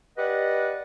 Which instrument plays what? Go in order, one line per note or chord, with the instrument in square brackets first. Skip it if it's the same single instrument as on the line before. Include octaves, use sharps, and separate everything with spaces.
[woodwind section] G4 B4 D5 D#5 F#5